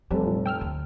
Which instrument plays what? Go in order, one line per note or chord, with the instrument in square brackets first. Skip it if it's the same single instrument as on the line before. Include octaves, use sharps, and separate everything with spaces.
[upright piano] F1 A4 [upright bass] G3 [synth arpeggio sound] G4 B4
[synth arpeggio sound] A#2 F3
G5 E6 F6
[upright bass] D2